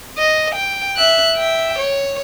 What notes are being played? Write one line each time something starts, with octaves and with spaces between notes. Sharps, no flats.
D#5
G5
E5 F#6
E5 G5
C#5